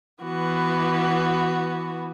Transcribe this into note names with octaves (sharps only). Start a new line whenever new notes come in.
E3 B3 F#4